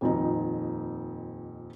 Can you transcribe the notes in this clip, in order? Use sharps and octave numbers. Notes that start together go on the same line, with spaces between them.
D#1 F2 D#4